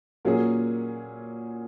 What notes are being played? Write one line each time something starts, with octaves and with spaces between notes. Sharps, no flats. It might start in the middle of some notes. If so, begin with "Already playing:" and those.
A#2 F#3 A#3 C#4 G#4